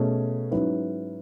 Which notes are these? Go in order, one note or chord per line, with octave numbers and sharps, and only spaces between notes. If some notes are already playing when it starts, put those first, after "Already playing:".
Already playing: B2 A3 C#4 G#4
G#2 F#3 C#4 E4 B4